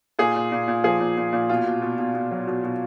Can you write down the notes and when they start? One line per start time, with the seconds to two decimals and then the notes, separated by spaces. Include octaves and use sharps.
0.19 A#2 G#4
0.36 A#2
0.52 A#2
0.68 A#2
0.84 F3 G#4
1.00 A#2
1.17 A#2
1.33 A#2
1.50 B2 F4
1.66 B2
1.82 B2
1.99 B2
2.14 B2
2.31 F#3
2.47 B2
2.64 B2